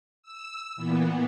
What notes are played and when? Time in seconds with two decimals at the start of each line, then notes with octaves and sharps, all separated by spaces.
0.23 E6
0.76 A#2 E3 B3